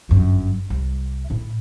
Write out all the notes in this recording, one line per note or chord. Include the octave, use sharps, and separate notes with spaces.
G1 F#2
C2
A2 E4